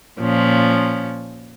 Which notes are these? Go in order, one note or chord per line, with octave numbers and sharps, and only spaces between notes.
A#2 F3 C#4